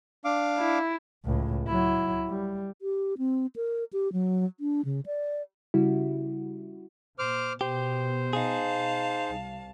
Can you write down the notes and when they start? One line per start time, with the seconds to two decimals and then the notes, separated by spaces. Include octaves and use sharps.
0.25 D4 F5 D6
0.58 E4
1.25 C#2 A2
1.67 F#3 E4
2.28 G3
2.82 G4
3.18 C4
3.56 A#4
3.93 G4
4.13 F#3
4.60 D4
4.85 C#3
5.06 D5
5.74 C#3 G3 E4 F#4
7.19 A#2 C5 D6 F6
7.61 B2 G4 C5
8.33 D#4 G#4 F5 A5
9.28 C2